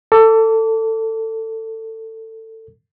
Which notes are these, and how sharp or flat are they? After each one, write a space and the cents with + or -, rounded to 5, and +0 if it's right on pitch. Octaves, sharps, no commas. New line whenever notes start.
A4 +20 D6 -30